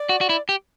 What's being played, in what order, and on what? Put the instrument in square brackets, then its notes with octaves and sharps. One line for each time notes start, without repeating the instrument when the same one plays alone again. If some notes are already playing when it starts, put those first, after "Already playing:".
Already playing: [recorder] D5
[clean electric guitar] F#4
F#4
E4
G4